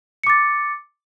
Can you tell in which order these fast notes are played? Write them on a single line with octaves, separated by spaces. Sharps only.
C#7 D6 A6